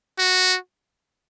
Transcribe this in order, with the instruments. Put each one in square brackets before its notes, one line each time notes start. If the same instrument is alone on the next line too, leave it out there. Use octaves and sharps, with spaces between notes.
[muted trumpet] F#4